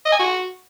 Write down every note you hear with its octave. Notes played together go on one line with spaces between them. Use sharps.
D#5
G#5
F#4